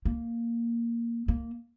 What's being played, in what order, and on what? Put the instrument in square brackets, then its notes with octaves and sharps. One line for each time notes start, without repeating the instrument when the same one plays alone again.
[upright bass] A#3
A#3